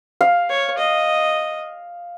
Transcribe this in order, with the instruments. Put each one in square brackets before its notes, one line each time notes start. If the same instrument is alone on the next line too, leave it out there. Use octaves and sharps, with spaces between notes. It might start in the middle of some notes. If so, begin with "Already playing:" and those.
[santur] F5
[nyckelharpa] C#5
D#5